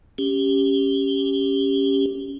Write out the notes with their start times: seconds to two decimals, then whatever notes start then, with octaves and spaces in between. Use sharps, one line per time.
0.18 C#4 G4